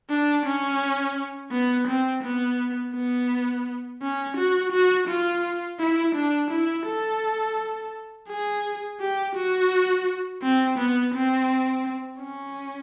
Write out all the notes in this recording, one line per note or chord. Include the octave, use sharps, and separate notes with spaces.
D4
C#4
B3
C4
B3
B3
C#4
F#4
F#4
F4
E4
D4
E4
A4
G#4
G4
F#4
C4
B3
C4
C#4